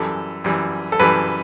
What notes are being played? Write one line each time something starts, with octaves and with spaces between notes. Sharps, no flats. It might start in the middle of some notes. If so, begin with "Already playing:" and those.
Already playing: F#2 E3 G3 A4
F#2 E3 G3
A4
F#2 E3 G3 B4